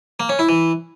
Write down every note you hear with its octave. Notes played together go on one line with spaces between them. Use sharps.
A#3
C#4
E4
E3